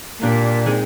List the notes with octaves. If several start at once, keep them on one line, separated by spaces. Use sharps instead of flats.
A#2 A#3 D4 G4 D5
G#3 C4 D#4 G#4